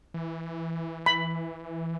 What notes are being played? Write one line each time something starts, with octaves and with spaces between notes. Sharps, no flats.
E3
B5